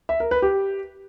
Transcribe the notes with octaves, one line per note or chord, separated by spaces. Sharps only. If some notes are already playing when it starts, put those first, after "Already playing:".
E5
A#4
B4
G4